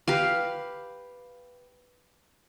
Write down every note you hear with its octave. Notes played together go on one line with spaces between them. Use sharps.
G4 B4 F5